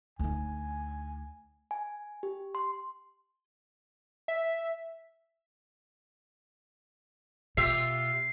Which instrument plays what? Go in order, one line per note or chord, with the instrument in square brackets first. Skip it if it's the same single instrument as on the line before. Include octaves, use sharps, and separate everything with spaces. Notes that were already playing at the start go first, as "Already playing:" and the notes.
[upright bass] D2 D#4 [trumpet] G#5
[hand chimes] G#5
G4
C6
[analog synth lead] E5
[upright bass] B2 [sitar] F4 G4 E5 [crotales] C7